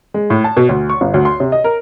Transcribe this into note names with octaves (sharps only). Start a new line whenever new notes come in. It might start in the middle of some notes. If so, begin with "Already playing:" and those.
G#3
A2
A5
B2
D2
C#6
G1
D2
C6
C3
D#5
A#4